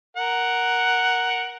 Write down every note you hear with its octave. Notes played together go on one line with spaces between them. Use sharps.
A#4 F#5